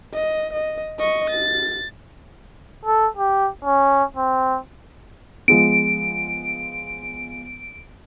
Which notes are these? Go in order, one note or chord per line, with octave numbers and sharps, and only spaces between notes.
D#5
D#5
D#5 C#6
A6
A4
G4
C#4
C4
F3 G#3 B3 D7